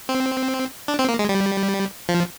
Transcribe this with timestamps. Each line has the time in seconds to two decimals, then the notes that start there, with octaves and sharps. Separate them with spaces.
0.09 C4
0.88 D4
0.99 C4
1.09 A#3
1.19 G#3
1.29 G3
2.09 F3